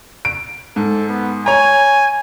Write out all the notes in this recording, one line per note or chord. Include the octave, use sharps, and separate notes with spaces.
D7
G#2 A4
B3
C#5 G#5 A#5